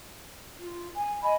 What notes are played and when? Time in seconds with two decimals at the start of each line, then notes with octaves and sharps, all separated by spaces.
0.60 F4
0.95 G#5
1.22 D#5 G#5 B5